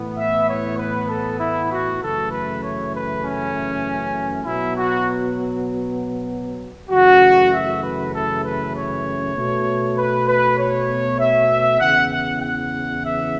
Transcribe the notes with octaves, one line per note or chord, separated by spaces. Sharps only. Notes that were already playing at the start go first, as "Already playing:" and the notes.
Already playing: A2 E3 B3
E5
C#5
B4
A4
E4
F#4
F#2 C#3 E3 A3 A4
B4
C#5
B4
C#4
B2 F#3 B3 E4
F#4
F#2 C#3 E3 A3 F#4
E5
B4
A4
B4
C#5
B2 A3
B4
B4
C#5
E5
E2 C#3 E3 B3 F#5
F#5
F#5
E5